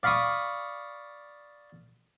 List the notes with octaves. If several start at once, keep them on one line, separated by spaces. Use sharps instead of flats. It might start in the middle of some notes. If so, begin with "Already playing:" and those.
D5 F5 B5 C#6 D#6